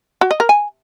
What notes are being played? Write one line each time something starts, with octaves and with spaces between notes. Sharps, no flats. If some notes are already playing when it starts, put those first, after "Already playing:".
F#4
D#5
A#4
G#5